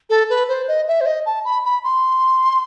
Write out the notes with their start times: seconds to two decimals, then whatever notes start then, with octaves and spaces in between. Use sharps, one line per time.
0.10 A4
0.30 B4
0.49 C5
0.68 D#5
0.88 E5
1.01 C5
1.06 D#5
1.26 A5
1.45 B5
1.65 B5
1.84 C6